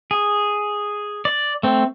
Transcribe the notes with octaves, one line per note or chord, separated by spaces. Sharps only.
G#4
D5
A3 C4